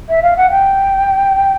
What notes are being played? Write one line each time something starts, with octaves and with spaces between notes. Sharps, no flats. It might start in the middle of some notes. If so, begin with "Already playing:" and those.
E5
F5
F#5
G5